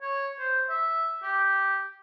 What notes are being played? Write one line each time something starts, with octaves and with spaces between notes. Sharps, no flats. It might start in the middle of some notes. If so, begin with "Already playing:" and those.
C#5
C5
E5
G4